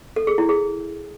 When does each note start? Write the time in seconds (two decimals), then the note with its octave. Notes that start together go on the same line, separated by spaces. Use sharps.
0.16 A4
0.27 G#4
0.38 E4
0.49 G#4